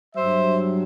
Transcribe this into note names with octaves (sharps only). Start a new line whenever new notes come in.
G2 F#3 C5 E5